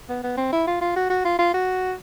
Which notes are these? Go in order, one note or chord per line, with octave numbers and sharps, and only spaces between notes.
B3
B3
C4
E4
F4
F4
F#4
F#4
F4
F4
F#4